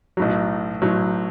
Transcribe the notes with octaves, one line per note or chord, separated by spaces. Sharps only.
B1 A2 F#3
B1 A2 F#3